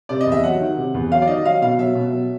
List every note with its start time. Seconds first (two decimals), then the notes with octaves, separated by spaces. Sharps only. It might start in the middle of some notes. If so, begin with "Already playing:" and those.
0.09 C3 D5
0.21 D#5
0.26 E2
0.32 E5
0.44 F#3 F#5
0.60 D#3
0.77 C3
0.94 E2
1.11 F#3 F5
1.22 D5
1.27 D#3 D#5
1.45 F#3 F5
1.62 B2 F5
1.79 F#3 E5
1.95 B2
2.13 F#3